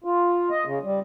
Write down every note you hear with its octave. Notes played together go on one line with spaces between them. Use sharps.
F4
D#5
C#3
G3